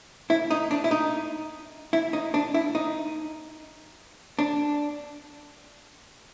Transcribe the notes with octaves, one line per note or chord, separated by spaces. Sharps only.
E4
D#4
D4
E4
D#4
E4
D#4
D4
E4
D#4
D4